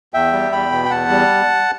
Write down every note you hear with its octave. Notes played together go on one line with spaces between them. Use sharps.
E2 E5 G5
G3
E2 G5 B5
B2
G5
E2 F#5 A5
G3